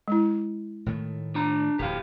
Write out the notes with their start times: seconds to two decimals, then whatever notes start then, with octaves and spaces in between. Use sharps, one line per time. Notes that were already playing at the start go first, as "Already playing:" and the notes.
0.08 G#3 E4
0.86 A2 D#3 A3
1.35 D4 A#5
1.79 D1 F2 G4 F5